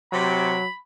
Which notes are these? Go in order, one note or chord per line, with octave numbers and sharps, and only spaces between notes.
C3 F#3 B5